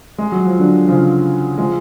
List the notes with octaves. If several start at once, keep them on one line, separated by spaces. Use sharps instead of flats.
G#3
F#3
F3
D3 F#3
C#3 F3
F3 G#3